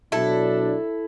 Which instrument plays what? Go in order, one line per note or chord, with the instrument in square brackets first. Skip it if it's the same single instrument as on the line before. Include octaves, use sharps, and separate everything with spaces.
[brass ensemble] B2 F#3 D4 [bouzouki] E4 A4